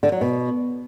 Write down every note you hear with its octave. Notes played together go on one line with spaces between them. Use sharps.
D3
F#3
B2